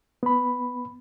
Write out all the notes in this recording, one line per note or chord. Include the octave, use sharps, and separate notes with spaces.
B3 B5